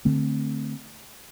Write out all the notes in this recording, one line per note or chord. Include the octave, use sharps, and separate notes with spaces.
D3 A3 C4